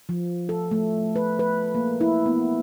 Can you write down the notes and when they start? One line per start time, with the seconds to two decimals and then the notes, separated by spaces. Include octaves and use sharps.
0.09 F3
0.49 A4
0.71 A3
1.16 B4
1.39 B4
1.75 A#3
2.01 E4
2.26 B3